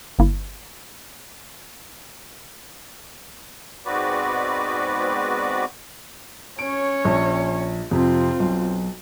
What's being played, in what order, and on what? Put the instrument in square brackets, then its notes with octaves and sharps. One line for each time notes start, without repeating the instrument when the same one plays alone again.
[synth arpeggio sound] G1 A#3 E4
[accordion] G#2 B3 C4 F#4 B4 D5
[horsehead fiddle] C#4 C#5 [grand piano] D7
[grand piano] A#1
[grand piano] F2 C3 [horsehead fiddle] C4 F4
[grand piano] B1